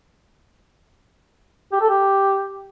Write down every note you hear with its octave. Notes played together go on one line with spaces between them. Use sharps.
G4
A4
G4